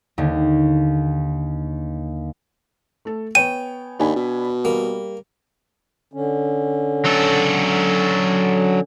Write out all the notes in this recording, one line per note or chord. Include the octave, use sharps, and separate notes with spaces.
D#2 D3
A3 A4
B3 C#5 G5 G#5 D#7
D#2 D4 G#5 B5
B2
G3 A#3
D3 C#4
F#3 A4